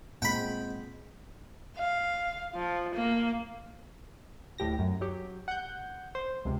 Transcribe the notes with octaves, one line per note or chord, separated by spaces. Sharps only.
A#2 G#3 C4 F#5 G5 B5
F5
F3
A#3
D2 A2 G4 A#6
F#2
F#3 G4
F#5 G6
C5
C#2 C3